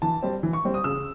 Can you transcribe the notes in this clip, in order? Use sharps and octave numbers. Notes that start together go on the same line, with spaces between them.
E3 A5
G3 C4
E3
C#6
G3 C4
D#6
C#3 E6